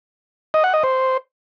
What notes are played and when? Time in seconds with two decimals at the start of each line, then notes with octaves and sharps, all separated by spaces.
0.54 D#5
0.64 F#5
0.74 D#5
0.83 C5